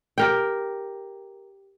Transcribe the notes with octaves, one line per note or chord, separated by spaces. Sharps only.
G4 A#4 G5